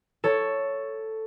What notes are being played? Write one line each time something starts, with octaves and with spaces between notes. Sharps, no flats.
A4 C#5